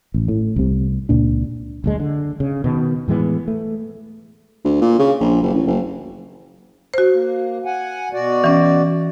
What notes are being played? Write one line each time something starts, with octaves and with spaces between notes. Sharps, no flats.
A1
A2
C2 C3
C#2 A#2 D4
F#1 D2 G#3
D3
C#3
B2 D#3
A2 E3 G#3 B3
A3
D2
A#2
C#3
A#1
F#1
A1
F#1
F#4 C5
A#3
F#5 G#5
B2 F#4 D5
E3 C#4